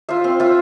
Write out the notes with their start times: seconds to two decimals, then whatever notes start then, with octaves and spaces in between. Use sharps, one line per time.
0.09 F4 C5 E5
0.24 C4
0.40 F4 C5 E5